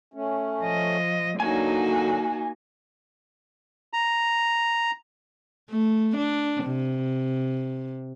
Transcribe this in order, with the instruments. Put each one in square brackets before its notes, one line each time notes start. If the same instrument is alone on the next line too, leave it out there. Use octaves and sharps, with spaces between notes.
[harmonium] A3 C#4
[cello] F3 D#5
[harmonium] D3 F#3 [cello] A#3 D#4 [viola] F#4 [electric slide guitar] G#5
[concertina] A#5
[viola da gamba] A3
D4
C3